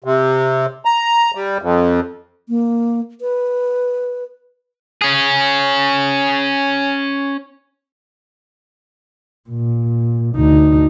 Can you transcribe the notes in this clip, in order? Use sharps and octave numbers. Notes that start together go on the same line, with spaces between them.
C3
A#5
G3
F2
A#3
B4
C#4 G#4
A#2
D2 D#4